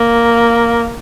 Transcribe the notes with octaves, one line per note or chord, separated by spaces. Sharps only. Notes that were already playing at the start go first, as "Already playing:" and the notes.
Already playing: A#3